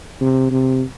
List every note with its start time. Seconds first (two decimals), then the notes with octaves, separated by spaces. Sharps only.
0.21 C3
0.51 C3